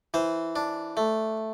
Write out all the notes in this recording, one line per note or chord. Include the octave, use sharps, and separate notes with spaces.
E3 C5
D4
A3